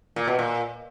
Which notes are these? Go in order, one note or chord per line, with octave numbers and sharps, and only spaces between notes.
A#2
B2
A#2